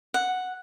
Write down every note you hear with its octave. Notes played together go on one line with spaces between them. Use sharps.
F#5